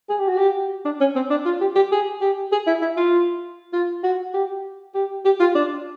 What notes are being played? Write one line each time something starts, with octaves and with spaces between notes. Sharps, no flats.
G#4
G4
F#4
G4
D4
C#4
C4
D4
F4
G4
G4
G#4
G4
G#4
E4
E4
F4
F4
F#4
G4
G4
G4
F4
D4